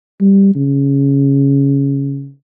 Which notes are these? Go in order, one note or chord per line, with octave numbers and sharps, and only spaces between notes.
G3
C#3